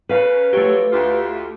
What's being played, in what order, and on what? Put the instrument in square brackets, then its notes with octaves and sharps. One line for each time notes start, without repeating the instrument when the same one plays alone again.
[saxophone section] C#3 C#4 A#4 [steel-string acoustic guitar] B4 F5
[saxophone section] F3 F#3 C#5 [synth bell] A3 G4
[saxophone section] D2 F4